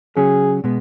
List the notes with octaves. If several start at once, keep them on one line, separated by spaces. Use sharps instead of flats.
C#3 F#3 C#4 G#4
B2 G#3 B3